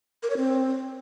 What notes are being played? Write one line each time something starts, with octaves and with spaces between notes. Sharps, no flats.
A#4
C#5
C4